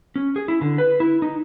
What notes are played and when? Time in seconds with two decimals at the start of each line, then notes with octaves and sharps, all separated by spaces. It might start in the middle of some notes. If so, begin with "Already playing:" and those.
0.16 C#4
0.36 G#4
0.48 E4
0.61 D3
0.78 B4
1.00 E4
1.22 D#4